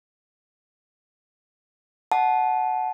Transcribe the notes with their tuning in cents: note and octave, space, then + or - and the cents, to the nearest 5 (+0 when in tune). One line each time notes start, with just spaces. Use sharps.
F#5 +0 A5 -20